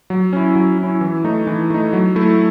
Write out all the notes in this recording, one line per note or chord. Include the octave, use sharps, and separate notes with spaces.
F#3
C#4 E4
F#3
E4
C#4
E3
A3 D#4
E3
A3 D#4
F#3
A3 E4